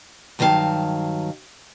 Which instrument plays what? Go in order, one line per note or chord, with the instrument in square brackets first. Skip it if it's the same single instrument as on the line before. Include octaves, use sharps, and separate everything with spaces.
[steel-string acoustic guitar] G2 D#3 F#3 E4 F5 A5